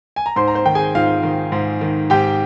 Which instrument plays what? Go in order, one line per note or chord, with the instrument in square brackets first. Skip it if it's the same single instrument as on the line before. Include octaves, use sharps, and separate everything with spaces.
[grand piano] G#5
A#5
G#2 C5 C6
A#5
C5 C6
D#3 G5
G#4 G#5
G#2 F4 F5
D#3
G#2
D#3
G#2 G4 G5